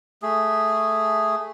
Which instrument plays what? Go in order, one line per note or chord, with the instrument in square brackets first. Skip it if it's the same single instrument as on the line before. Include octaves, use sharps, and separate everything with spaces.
[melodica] A3 G#4